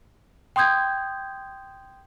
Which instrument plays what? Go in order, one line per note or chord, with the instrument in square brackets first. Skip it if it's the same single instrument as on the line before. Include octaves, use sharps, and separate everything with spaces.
[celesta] G5 C6 D#6 G6 G#6